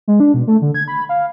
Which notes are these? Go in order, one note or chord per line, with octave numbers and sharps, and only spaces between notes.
G#3
D4
B2
A3
D3
G#6
B5
F5